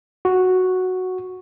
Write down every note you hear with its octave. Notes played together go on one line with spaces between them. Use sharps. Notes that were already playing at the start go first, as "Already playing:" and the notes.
F#4